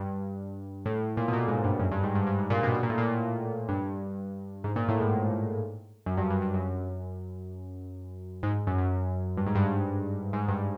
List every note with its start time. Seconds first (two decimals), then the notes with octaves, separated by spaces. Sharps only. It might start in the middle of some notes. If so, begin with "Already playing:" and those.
Already playing: G2
0.86 A2
1.17 A#2
1.28 B2
1.33 A#2
1.48 G#2
1.64 G2
1.79 F#2
1.92 G2
2.03 G#2
2.15 G2
2.27 G2
2.39 G#2
2.50 A#2
2.63 B2
2.74 B2
2.83 A#2
2.89 A2
2.98 A#2
3.69 G2
4.64 G#2
4.76 A#2
4.88 A2
5.00 G#2
6.06 F#2
6.18 G2
6.30 G2
6.42 G2
6.54 F#2
8.43 G#2
8.67 F#2
8.78 F#2
9.37 G2
9.47 G#2
9.55 G2
10.33 G#2
10.48 G2